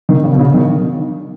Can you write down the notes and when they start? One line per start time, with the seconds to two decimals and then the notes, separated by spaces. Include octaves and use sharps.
0.09 D#3
0.24 C#3
0.33 B2
0.39 C#3
0.54 D#3